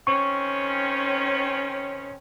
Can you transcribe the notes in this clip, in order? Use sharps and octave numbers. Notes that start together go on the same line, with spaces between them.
D#3 C4 C#4 C#6